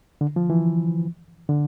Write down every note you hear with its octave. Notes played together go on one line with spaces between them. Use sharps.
D3
F3
E3
D3